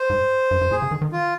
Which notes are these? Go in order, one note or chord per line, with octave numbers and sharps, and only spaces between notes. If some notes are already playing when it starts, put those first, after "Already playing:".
Already playing: C5
G#2
G2
G2
A#2 G#4
C#3
D#3
D#3
F4